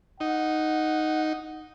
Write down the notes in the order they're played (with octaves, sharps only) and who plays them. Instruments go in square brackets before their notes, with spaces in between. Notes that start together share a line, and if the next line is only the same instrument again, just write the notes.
[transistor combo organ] D#4 [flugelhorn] F#5